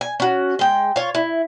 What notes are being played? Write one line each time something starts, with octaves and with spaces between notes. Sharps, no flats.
G#5
C#4 F#4
G#3 G5
F4 C#5
E4